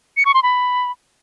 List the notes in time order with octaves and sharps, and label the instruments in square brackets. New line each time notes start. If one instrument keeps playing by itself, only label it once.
[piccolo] C#7
C#6
C6
B5